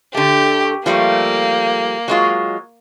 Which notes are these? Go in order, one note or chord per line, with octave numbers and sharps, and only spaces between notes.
D3 A3 G4
F3 G3 A3 A#3
F#3 G#3 F4